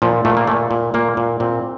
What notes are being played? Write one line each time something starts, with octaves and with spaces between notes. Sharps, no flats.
A#2 F3
A#2 A3
A#3
A#2 A3
A#2
A#2 A#3
A#2
A#2 C4